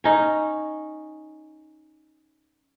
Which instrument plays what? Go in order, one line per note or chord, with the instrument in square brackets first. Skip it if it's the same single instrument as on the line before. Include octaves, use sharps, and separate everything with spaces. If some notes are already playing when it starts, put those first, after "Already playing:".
[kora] C#4 D#4